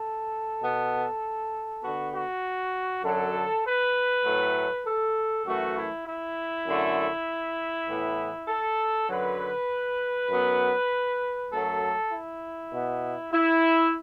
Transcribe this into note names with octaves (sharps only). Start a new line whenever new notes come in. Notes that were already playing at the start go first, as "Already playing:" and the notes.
Already playing: A4
B2 B3
D3 B3 F#4
F#4
F#2 D3 F#3 A4
B4
A2 F#3 A3
A4
F#2 E3 A3 F#4
E4
E4
F#2 D3 A3
A2 E3 B3
A4
F#2 D3 F#3 B4
F#2 F#3 B3
F#2 F#3 A3 A4
E4
B2 B3
E4